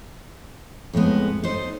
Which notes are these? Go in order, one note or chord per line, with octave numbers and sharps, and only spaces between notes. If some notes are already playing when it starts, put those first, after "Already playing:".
F2 A2 G#3 B3
D#4 A4 C5